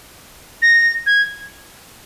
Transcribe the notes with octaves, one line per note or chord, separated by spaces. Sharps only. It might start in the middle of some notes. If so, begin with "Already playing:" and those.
A#6
G#6